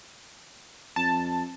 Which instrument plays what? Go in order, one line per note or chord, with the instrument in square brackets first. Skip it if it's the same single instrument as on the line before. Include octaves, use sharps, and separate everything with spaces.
[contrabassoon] F2 [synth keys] A5